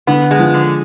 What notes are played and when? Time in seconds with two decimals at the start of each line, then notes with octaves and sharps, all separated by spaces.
0.07 D3 B3
0.31 G#3
0.39 F3
0.54 D3